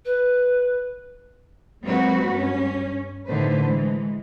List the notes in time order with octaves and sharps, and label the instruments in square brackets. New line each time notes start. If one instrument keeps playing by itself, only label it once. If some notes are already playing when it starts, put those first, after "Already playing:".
[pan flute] B4
[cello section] F#3 G#3 A#3 C4 F#4 B4
G2 C#4
A2 D3 D#3 A3 B4 C5
E3 G#3